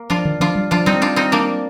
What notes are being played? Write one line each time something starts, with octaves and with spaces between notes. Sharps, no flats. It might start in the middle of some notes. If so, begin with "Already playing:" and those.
Already playing: A#3
F3 D4 F4
D#3
F3 D4 F4
G3
F3 D4 F4
G3 C4 D#4
D4 F4
C4 D#4
A#3 D4